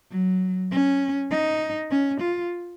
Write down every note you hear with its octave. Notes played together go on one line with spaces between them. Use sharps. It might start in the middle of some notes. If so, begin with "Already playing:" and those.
F#3
C#4
D#4
C#4
F4